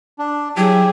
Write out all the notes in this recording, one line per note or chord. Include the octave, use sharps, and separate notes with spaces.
D4
F#3 E4 G4 G#4